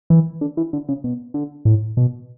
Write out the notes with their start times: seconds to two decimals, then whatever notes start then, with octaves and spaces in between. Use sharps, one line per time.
0.10 E3
0.41 D3
0.57 E3
0.73 D3
0.89 C#3
1.04 B2
1.34 D3
1.65 A2
1.97 B2